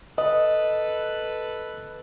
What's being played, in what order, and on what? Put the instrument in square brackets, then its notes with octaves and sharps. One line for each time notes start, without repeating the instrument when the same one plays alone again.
[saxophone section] A4 B4 [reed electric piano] D#5